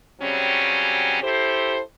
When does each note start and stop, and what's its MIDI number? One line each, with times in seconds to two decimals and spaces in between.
0.22 1.18 49
0.22 1.18 54
0.22 1.18 55
0.22 1.18 60
0.22 1.18 61
1.22 1.80 64
1.22 1.80 67
1.22 1.80 69
1.22 1.80 72